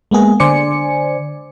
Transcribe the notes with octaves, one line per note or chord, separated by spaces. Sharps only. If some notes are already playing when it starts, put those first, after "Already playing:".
G#3 A#3 B3 G#4
D3 C5 D5 G#5 C#7